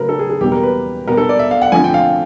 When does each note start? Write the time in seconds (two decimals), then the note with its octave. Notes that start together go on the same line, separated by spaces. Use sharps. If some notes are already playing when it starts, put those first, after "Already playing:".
Already playing: C#3 F#3 A3 A#4 B4
0.09 A4
0.19 G#4
0.30 G#4
0.41 E2 B2 G3 A#3 G4
0.52 A#4
0.63 B4
1.08 B2 G3 B3 A#4
1.17 A4
1.29 D5
1.39 E5
1.51 F5
1.62 F#5
1.72 F2 D3 F3 A3 G#5
1.84 G5
1.94 F5